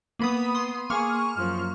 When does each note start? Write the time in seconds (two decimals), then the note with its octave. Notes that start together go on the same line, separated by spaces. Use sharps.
0.19 A#3 B3 B5 D#6
0.55 C6 D#6
0.90 A#3 G#4 C#6 F6
1.36 F#2 F3